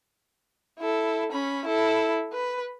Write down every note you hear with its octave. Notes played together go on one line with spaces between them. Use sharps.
E4 A4
C#4 B5
E4 A4
B4